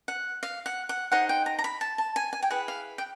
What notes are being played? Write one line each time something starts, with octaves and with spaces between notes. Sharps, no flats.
F#5
F5
F#5
F#5
D#4 G#4 C5 F#5
G5
A#5
A#5
B5
A5
A5
G#5
G#5
G5
E4 G#4 B4 F#5
F5
G5